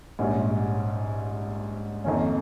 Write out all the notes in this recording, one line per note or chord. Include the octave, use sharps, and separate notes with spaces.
A#1 G#2 G3 C#4
F2 D#3 A#3 C#4